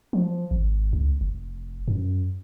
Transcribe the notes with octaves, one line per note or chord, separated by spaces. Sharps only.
F3
G#1
C#2
F1
F#2